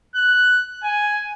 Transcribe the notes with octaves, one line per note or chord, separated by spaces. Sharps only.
F#6
G#5